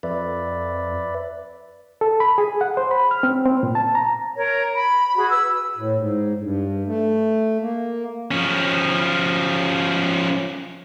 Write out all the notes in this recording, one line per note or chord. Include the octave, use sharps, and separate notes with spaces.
F2 B4 D5 E5
A4
B5
G#4
F#5
C5
B5
F6
C4
C4
A#2
A5
A#5
A#4 C#5
B5
F#4 G#4 B5
B4 E6
A2
G#2
G2
A3
A#3
F3 C#4